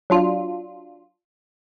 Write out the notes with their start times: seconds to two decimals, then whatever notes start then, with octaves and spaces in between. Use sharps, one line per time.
0.10 F#3 D4 F4